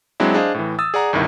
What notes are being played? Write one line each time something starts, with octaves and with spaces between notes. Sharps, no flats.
F#3 G#3 C4 D4 E4
D4 G#4 C5 D#5 F5
A2 E3
D#6 E6 A6
G#4 D5 F#5 A#5
G1 C2 G2 D#3 E4